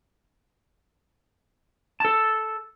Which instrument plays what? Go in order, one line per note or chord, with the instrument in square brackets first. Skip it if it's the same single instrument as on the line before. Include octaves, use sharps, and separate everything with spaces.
[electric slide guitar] A4 A5